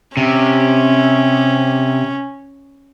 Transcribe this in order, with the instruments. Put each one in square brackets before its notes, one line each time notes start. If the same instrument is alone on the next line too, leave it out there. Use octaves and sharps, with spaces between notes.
[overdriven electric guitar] C3 [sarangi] C#4